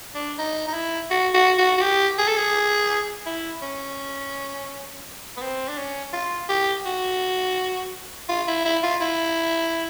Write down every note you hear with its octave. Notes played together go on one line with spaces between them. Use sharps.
D4
D#4
D#4
E4
F#4
F#4
F#4
F#4
G4
G#4
A4
G#4
E4
C#4
B3
C4
D4
C#4
F4
G4
F#4
F4
E4
E4
F4
E4